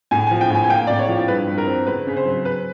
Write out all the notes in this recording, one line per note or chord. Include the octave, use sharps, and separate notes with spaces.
A2 G#5
F3 G#5
G5
A2 G#5
G#5
A#3 G5
A2 D5
C#5
F3
G2 B4
G2
A#4
C4
C#2 B4
C#3
C5
F#3
C4 B4